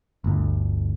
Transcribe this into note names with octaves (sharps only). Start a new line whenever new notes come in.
G1 D2